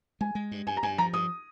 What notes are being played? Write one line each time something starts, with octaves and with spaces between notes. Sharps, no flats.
G#3 G#5
G#3
G2
G2 G#5
A#5
G2 G#5
F3 A#5
G2 D#6